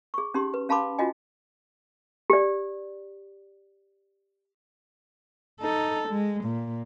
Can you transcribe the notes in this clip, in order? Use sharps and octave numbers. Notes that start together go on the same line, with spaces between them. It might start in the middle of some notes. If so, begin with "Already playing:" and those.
G#4 C#6
C#4 D#4 G4 C6
B4
C#4 F5 A5 B5 C6 D6
C#4 D#4 F4 F#4 D#5 G#5
G4 D5
D#4 A4
G#3
A#2